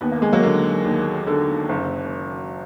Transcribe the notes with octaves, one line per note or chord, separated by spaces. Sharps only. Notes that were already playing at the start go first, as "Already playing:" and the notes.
D#2 B3
A#3
G#3
F#3 A#3
D3
D#2
D3
F#1